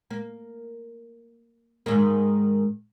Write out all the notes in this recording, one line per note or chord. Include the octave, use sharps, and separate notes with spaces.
A#3
G#2 D#3 A#3